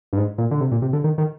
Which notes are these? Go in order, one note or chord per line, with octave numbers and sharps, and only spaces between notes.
G2
G#2
A#2
D3
C3
A#2
C3
D3
D#3
D#3